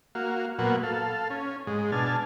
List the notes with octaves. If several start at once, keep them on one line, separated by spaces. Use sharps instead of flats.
A#3 F#4 F5
A#2 F#3 A#3 B3 F#5
A4 F5
C#4
G#2 G#3
B2 D4 G#5 A5 F6